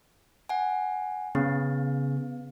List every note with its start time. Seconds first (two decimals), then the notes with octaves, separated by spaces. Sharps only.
0.49 F#5 G#5
1.35 C#3 B3